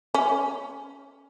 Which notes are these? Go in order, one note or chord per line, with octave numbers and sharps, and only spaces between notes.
C#4